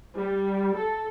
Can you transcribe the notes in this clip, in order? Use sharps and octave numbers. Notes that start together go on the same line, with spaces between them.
G3
A4